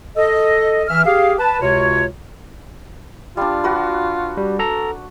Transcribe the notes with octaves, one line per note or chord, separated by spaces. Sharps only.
A4 D#5
E3 C#4 E5 F6
G4 G#4 F5
B4 A5
C#2 C3 F4 F#4 C#5
G3 D4 F4
F#4 B4
G3
A4 A#5